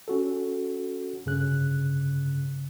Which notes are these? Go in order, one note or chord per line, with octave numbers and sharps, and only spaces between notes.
C#4 F#4 A4
G2 C#3 F#6